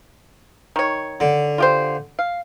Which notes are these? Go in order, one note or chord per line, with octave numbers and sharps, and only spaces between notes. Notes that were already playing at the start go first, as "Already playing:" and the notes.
D#3 C#5
D3
F4 G4 C5
F5